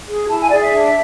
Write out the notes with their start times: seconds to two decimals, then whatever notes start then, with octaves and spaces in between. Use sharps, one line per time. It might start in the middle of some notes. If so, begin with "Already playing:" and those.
0.08 G#4
0.29 E4 A5
0.40 G#5
0.50 G#4 D5
0.61 E5
0.71 D4